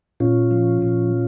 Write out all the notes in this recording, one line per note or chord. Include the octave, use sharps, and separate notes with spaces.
A#2 C#4 F4
F3
A#2